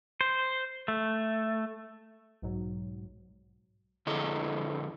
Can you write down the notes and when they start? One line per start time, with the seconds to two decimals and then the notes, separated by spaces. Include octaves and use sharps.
0.21 C5
0.88 A3
2.42 B1 G#2 F#3
4.06 F2 D3 E4 G#4 A4 D#5